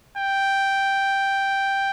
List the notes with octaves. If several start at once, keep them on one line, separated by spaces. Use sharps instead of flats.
G5